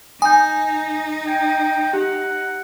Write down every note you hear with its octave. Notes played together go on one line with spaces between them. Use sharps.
D#4 G#5 D#6 G6
G5 G#6
G4 F#5